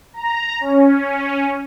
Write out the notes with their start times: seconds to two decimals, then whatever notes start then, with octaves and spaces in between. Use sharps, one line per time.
0.14 A#5
0.61 C#4